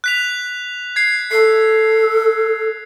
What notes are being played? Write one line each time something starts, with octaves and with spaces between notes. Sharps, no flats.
F#6 B6 F7
G#6 C7
A4 C7